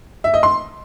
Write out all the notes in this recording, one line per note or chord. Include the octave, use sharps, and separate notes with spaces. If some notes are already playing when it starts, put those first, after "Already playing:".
E5
D#5
C6